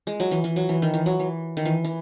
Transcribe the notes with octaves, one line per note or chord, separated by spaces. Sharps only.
G#3
F#3
E3
E3
F#3
E3
D#3
E3
F#3
E3
D#3
E3
E3